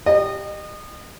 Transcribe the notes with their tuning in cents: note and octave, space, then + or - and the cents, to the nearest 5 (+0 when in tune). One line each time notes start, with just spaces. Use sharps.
G4 +0 D#5 -30